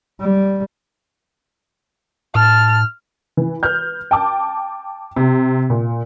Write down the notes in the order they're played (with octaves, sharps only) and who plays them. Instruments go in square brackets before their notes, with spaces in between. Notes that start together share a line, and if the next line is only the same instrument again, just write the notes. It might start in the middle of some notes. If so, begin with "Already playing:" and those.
[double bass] G3
[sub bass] A2 [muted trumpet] A5 [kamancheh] F6
[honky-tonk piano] E3
B4 F6 G6
G5 A5 D6
C3
A#2